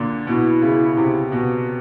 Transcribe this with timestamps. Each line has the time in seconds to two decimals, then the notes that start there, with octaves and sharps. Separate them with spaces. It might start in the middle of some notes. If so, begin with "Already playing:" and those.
Already playing: A#2 D3
0.27 B2 E4
0.62 C#3
0.97 C3
1.32 B2